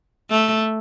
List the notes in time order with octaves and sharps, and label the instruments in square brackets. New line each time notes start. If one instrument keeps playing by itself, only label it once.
[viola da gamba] A3